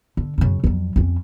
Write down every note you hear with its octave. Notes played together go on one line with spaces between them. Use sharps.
D3
F#2 C#3
F2 F#3
F2 C#4